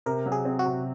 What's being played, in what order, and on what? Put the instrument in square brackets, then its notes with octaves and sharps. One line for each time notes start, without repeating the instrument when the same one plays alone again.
[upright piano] C3 [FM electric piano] A#4
[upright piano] F#3
[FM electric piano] G#4
[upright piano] C4
[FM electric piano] F#4
[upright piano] C3